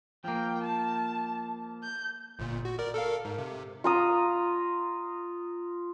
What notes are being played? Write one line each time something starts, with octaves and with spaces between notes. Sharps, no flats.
F3 A#3 G5
A5
G6
G1 A#2
F#4
A#4 D5
A4 A#4 F5
G#2
C3
F4 A#5 D#6